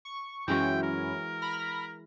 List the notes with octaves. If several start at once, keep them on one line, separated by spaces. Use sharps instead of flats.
C#6
F#2 E3 G#3 C#4 E4 F#4 G5
A#4
B5 F6 A#6